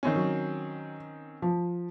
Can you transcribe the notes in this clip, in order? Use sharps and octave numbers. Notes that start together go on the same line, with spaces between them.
D#3 C4 C#4
F#3
F3